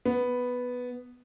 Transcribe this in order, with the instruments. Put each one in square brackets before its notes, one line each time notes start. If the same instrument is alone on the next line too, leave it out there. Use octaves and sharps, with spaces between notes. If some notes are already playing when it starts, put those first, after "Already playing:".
[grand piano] B3